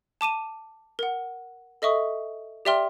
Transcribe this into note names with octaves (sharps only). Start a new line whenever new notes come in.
A5 D6 D#7 E7
A#4 F#5
A4 D#5 E5 C#6 D#6
G4 D5 E5 G5 C6 F6